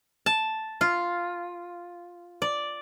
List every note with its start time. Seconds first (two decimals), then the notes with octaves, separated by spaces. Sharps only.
0.26 A5
0.81 F4
2.42 D5